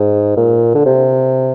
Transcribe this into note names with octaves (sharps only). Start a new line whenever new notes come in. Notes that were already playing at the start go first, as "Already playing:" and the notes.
Already playing: G#2
A#2
D3
C3